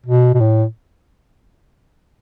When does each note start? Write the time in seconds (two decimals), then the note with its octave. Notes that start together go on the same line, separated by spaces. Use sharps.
0.06 B2
0.34 B2
0.40 A2